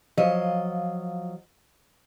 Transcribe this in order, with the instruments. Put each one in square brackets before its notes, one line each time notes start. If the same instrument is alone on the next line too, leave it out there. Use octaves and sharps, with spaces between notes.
[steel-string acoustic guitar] F3 F#3 F4 D#5